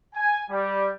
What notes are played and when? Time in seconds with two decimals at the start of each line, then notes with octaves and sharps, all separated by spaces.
0.15 G#5
0.51 G3